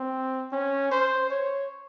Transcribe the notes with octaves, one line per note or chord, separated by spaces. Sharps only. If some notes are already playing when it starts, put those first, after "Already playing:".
Already playing: C4
C#4
C5
C#5